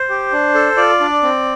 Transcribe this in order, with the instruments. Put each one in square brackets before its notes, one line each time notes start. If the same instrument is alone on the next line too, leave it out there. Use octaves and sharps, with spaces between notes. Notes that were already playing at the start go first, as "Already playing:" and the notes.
Already playing: [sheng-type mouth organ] C5
G4
D4
A4
F4 D5
D4
C4